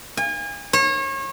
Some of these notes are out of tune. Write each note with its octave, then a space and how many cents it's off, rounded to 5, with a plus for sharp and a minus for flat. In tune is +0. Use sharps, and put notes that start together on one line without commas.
G#5 -35
C#5 -35